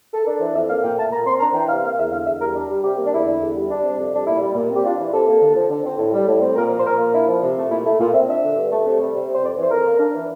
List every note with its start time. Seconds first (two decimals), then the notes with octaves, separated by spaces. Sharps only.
0.14 A4
0.26 D4 A#4
0.40 E3 C5
0.54 F2 E5
0.69 A#3 F5
0.83 A#2 G5
0.97 A3 A5
1.11 A#2 A#5
1.26 C4 C6
1.40 D4 A#5
1.54 E3 G5
1.68 C3 F5
1.83 A#3 F5
1.98 E2 E5
2.12 D3 F5
2.26 E2 E5
2.41 G3 A#4
2.54 D4
2.69 G3
2.83 C3 G4
2.97 A#3
3.05 D4
3.12 E2 E4
3.26 D3
3.41 E2
3.56 G3
3.69 D4
3.84 C3
3.99 F2
4.12 G3 D4
4.27 A#2 E4
4.41 G3
4.55 A#2
4.71 C4
4.76 G4
4.84 D4 F4
4.99 E3
5.13 C3 A4
5.28 A#3
5.41 D3
5.55 F3
5.70 D3
5.85 C4
5.98 A2
6.13 G3
6.27 A2
6.41 C4
6.56 A#2 A#4
6.70 F3
6.79 C5
6.85 A#2 A#4
6.99 A#3
7.13 D4 E4
7.29 F3
7.42 C3
7.57 A3
7.70 A#2 E4
7.85 A3 E4
7.99 A#2 F4
8.13 C4 E5
8.29 D4 E5
8.43 D3
8.57 G2
8.72 A3
8.85 C3
9.00 G3
9.15 C3
9.29 C4
9.34 C5
9.43 F2 D5
9.57 E3 C5
9.71 F2 A#4
9.86 A#3
10.00 D4
10.15 E3